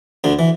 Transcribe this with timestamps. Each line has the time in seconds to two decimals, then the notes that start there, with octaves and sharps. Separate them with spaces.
0.24 D2 D3
0.39 E3